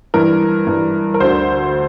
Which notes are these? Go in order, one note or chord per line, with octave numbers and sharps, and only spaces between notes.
G2 E3 A#4
G2 E3
A#4
D2 D3 C5